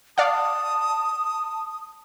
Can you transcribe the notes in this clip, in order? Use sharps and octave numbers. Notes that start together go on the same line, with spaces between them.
D5 F5 F#5 A5 D#6